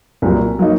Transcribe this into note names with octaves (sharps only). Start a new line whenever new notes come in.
C2 A#2 F#3
F#3 A#3 D#4